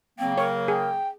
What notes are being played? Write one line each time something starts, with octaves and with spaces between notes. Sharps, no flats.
C#3 F#3 A#3 C4 G5
A#4 C#5
G#4 G5